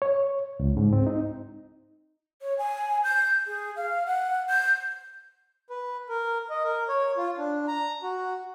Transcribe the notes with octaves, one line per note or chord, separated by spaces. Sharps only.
C#5
C#2
G#2
C4
D#4
C#5
G#5
G6
G#4
F5
F#5
G6
B4
A#4
D#5
A#4
C#5
F4
D4
A#5
F#4